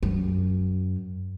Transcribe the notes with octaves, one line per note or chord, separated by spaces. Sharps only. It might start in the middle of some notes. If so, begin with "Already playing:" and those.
F#2